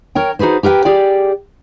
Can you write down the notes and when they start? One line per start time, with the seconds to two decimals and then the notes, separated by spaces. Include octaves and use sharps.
0.15 A#4 C#5 G5
0.39 D#4 F#4 G#4 B4 C5
0.63 G4 A#4 B4 F5 G5
0.85 G4 G#4 D5 G5